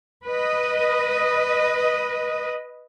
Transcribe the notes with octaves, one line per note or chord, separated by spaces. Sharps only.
B4 D#5